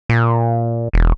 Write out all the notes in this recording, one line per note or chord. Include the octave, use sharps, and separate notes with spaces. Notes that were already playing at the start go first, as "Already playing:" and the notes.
A#2
E1